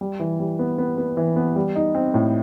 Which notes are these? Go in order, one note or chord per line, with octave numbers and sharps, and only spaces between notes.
G3
E3
G3
B3
B3
B3
E3
B3
G3
D#4
C4
A2